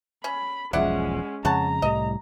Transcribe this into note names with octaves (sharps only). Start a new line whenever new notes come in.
C#4 B5
E1 B1 F3 G#3 C#4 E4 D5 F#5
F2 C#3 G#3 C#5 F#5 A5 A#5
C2 A2 G3 D#5